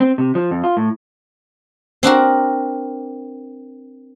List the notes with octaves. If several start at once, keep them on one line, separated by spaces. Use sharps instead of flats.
C4
C3
F3
F2
F4
A2
C4 D4 F#4 A#4